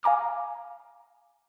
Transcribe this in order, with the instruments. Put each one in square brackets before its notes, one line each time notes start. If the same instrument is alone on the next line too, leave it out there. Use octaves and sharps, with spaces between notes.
[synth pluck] F5 G#5 A#5 D6 F6